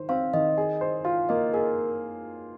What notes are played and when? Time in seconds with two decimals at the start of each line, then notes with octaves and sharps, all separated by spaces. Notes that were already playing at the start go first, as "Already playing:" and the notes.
Already playing: D#3 C5
0.09 C4 F5
0.33 D#3 D#5
0.57 G#4 D#5
0.81 C5
1.05 F4 F5
1.29 A#3 D#5
1.54 G#4 A#4